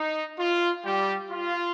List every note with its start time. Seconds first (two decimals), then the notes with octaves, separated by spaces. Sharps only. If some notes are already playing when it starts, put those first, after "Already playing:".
Already playing: D#4
0.39 F4
0.85 G3 G4
1.31 F4